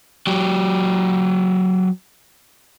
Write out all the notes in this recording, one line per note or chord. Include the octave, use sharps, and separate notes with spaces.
F#3 G4